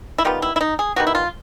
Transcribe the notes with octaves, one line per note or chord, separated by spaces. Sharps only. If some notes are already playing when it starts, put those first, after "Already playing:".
E4
D#3 G3 B3 F4
E4
E4
D#4
G#4
D#3 G3 B3 F#4
E4
F4